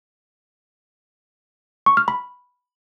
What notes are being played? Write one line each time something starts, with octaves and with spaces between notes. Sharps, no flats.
C#6
F6
B5